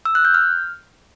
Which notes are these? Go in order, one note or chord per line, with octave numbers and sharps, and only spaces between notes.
E6
F#6
G6
F6